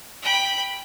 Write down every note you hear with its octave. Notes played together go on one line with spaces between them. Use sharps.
G5 B5